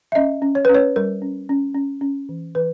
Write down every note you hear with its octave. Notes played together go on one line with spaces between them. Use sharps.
E5
C#4 D#5
C#4
C#5
B4
C#4
C#5
G3 A#4
C#4
C#4
C#4
C#4
E3
E3 B4